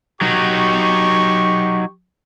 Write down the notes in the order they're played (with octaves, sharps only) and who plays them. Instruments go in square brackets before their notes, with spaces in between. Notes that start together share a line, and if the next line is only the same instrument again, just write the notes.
[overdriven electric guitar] F#3 D#4 [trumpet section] G4 C#6